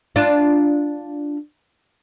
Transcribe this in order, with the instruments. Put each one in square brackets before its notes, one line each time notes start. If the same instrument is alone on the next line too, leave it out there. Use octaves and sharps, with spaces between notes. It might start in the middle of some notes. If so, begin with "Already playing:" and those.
[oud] D4 F4